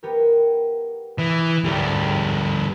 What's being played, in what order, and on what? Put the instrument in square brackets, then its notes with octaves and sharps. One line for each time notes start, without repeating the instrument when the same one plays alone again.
[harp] B3 G4 A#4
[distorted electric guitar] E3 [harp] D#6
[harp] F1 G#2 G4 [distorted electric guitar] D2 G3